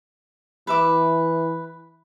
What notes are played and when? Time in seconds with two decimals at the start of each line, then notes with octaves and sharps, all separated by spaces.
0.67 E3 B4 E5 D6